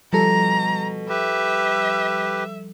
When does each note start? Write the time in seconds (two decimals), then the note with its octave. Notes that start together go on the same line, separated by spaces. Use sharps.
0.13 B2 F3 G3 A4 A#5
1.09 G4 B4 E5